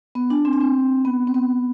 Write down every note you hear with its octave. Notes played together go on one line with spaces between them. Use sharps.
B3
D4
C4
D4
C4
B3
C4
B3